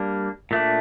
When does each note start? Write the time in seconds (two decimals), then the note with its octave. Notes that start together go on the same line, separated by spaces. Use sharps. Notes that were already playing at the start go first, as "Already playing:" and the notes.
Already playing: G3 A#3 D4
0.51 A#2 A3 D4